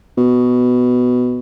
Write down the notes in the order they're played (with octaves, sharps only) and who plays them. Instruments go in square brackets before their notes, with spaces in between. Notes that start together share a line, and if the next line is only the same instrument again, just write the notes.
[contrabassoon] B2